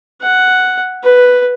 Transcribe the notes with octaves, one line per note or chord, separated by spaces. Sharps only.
F#5
B4